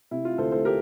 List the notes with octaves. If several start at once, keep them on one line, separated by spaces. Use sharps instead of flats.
C3 E4
F4
D2 A4 C5
A4 C5
G4 A#4